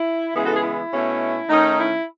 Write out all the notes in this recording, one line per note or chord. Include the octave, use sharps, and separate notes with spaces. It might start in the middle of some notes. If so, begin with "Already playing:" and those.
Already playing: E4
C#3 E3 G#3 B3 E4 G#4
F#4 A4
E4 G#4
E4
B2 A3 C#4
D#3 A3 C#4 D#4
E4